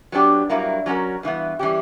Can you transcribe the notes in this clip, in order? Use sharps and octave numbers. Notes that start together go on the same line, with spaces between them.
F#3 B3 D4 G4
G2 F#3 A#3 E4
F#3 C#4 F#4 A#4
G2 E3 B3
E3 G3 C#4 G4